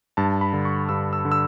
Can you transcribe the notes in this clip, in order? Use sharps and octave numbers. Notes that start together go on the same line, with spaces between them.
G2 A5
B5
D3
C#6
G2 E6
E6
D3
E6